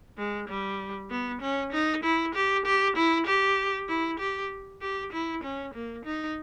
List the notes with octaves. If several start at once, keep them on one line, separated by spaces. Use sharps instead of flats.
G#3
G3
B3
C#4
D#4
E4
G4
G4
E4
G4
E4
G4
G4
E4
C#4
A#3
D#4